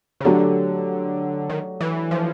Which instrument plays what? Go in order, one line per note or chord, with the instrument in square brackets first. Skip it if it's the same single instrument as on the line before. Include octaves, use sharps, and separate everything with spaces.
[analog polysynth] C#3
[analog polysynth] D3 [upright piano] F#3 A3 D4 G4
[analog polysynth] D#3
E3
F3